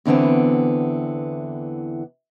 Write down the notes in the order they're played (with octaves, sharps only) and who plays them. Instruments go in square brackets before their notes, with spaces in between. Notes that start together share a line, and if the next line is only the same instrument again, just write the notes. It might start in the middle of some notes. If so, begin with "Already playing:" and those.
[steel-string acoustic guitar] E2 D3 E3 B3 C4